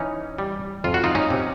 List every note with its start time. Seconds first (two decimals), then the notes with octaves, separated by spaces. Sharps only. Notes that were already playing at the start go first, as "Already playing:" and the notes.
Already playing: E3 C#4 D#4
0.38 G3
0.84 F2 F4
0.94 F#4
1.04 D#4 F4
1.15 C#4 D#4
1.30 C3